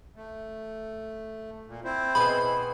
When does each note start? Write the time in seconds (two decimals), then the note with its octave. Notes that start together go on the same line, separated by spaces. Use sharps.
0.16 A3
1.67 A#2
1.84 C4 E4 C5
2.15 B2 G#4 B5